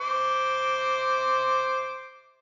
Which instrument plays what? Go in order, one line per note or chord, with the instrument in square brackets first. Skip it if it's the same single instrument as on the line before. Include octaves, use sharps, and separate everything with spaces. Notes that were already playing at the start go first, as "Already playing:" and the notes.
[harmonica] C5 D6